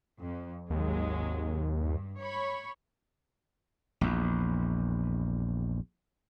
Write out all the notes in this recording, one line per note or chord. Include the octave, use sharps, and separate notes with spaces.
F2
G#1 D#2 F#3 G#3
G2
C#5 B5 C#6
A#1 E2